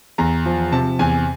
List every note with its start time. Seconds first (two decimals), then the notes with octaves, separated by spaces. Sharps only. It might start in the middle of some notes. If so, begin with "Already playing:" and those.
0.18 E2 A#5
0.46 F3
0.72 C3 A5
0.99 E2 G#5